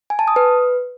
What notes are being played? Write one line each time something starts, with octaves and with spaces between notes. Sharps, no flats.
G#5
A5
D#6
B4